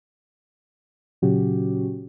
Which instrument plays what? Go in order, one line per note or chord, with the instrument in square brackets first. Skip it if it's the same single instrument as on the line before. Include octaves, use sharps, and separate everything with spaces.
[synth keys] A#2 C#3 F#3 C#4 F#4 G4